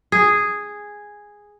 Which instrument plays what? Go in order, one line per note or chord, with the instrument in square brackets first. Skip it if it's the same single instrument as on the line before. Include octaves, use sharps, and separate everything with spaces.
[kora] G#4